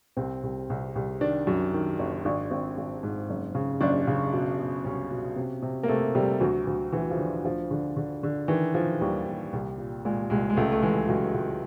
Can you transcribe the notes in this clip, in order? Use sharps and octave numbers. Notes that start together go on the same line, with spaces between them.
C2 C4
C2
C2
C2
D#3 D4
F#2
D#3
F#1
G#1 D4
G#1 C4
G#1
G#2
F#1
C#3
F#1 D4
C#3
B2
B2
C2 C#4
B2
C3
C3
A#3
C3 A3
C3 G3
D2 F#3
D2
D2 E3
F3
D3
D2 F3
D3
D3
D3
D#3 E3
D#3 F3
D#2 G3
D#2
C2
A#2
A#2 G#3
C2 G#3
G#3
C#2 A3
A3
E3 G#3
C#2 F#3
C#2